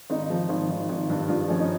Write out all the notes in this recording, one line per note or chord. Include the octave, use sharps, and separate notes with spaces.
G#1 D#4
F3
G#1
G#1
G#1
G2
G2 F4
F3 C#4
D#4